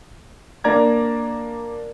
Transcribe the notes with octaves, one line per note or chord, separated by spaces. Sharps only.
A#3 D4 D5 A#5 G#6